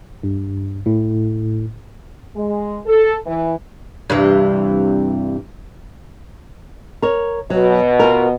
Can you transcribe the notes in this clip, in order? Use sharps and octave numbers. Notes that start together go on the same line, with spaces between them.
G2
A2
G#3
A4
E3
G2 C3 E3
A#4 C#5
B2 F#3
F4 A#4